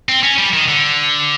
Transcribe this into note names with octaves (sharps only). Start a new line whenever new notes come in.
C4
C#4
G3
D#3
D3